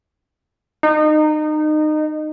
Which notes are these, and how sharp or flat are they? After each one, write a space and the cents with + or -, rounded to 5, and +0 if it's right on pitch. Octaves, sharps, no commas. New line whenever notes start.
D#4 -25